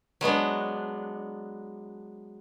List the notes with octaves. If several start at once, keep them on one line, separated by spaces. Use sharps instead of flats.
F#3 G#3 B3 D4